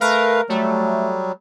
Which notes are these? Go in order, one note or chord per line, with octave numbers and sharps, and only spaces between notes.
A3 A#4 B4 F5
F#3 G3 A3